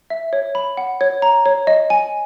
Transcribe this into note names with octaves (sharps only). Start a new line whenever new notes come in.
E5
C#5
B5
F#5
C#5
A#5
C#5
D#5
G#5